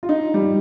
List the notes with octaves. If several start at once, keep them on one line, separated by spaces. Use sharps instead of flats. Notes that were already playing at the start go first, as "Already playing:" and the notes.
F4
D#4
G3